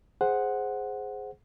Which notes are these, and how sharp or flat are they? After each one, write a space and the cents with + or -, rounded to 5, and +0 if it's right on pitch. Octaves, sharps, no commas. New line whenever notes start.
G#4 +0 C5 +0 F#5 +0